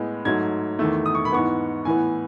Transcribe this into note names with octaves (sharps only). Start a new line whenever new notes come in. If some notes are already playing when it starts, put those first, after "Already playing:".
Already playing: A2 G#3 B3
G#2 F#3 A3 G#6
E2 D#3 A3 E6
D#6
C#6
B5
G#2 E3 B3 C#6
A2 E3 B3 G#5